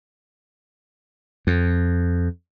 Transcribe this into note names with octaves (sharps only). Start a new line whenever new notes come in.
F2